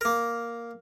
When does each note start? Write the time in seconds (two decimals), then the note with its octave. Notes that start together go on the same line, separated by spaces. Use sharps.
0.01 A#3 A#4